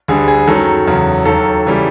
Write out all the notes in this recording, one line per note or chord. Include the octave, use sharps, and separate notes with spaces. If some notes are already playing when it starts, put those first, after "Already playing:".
D2 D3 G3 G#4
G#4
F#2 D#3 F#3 A4
E2 C#3 F#3
D#2 D#3 F#3 A4
C#3 E3 G3